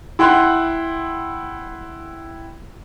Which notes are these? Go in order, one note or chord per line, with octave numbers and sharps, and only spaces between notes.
E4 F#5 G5 C6 F#6